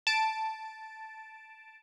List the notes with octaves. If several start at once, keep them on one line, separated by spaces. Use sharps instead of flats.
A5 D7